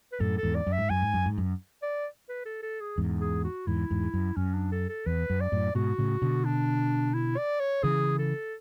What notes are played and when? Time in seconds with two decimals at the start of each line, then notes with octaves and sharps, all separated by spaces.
0.12 B4
0.20 F#2 A2 A4
0.38 A4
0.43 E2 G#2
0.55 D5
0.67 F#2
0.72 E5
0.78 G#2
0.90 F#2 G#5
1.02 G#2
1.14 F#2
1.26 G#2
1.38 F#2
1.82 D5
2.29 B4
2.46 A4
2.63 A4
2.81 G#4
2.98 E2 G#2
3.21 G#4
3.44 F#4
3.67 E2 G#2 E4
3.90 E2 G#2
4.14 F#2
4.37 F#2 C#4
4.54 D4
4.72 A4
4.89 A4
5.06 E2 B4
5.30 F#2
5.41 D5
5.52 F#2 A2
5.75 G#2 B2 F#4
5.98 A2 C#3
6.22 B2 D3
6.45 D4
7.14 E4
7.37 D5
7.60 C#5
7.83 C#3 E3 G#4
8.19 A4